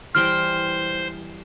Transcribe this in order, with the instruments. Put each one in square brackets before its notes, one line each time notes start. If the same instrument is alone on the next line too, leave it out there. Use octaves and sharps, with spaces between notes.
[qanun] E3 G3 G5 [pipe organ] C5 [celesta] F6